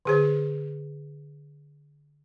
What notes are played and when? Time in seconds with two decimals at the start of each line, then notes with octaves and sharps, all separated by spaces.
0.05 D3 G#4 C5